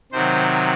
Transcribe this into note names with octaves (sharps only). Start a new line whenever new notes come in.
C3 D#3 F#3 C5